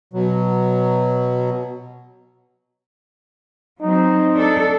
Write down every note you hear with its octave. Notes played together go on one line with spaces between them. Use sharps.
B2 F#3
F#3 C4 D#4
D4 A4